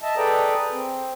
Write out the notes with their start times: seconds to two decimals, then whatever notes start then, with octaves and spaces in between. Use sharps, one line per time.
0.01 D#5 E5 A5
0.17 G#4 A4 B4 D5 G5 A#5
0.72 C4